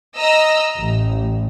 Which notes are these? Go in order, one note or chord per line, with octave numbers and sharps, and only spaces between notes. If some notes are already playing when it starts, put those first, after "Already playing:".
D#5 A#5 E6
A1